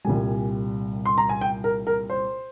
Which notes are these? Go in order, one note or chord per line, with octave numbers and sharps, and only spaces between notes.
C2 A#2 G3 G#5
C6
A#5
G#5
G5
A#4
A#4
C5